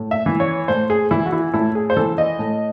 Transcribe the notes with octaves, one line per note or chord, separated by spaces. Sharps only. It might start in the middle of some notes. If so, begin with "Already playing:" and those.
Already playing: A2
E5
E3
C#5
A2 C5
G#4
E3 E4
F#4
E4
A2 E4
G#4
C5
E3 A4
D#5
A2